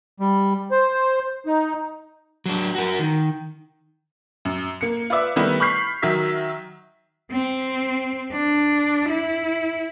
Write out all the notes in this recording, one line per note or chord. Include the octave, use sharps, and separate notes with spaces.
G3
C5
D#4
F#3 D4
F#4 A#4
D#3
F#2
A#3 C#7
F4 B4 D5 E5
D#3 G3 A3 B3 E4 B4
B5 C#6 F6 G6 B6 C7
D#3 F#3 E5 B6
C4
D4
E4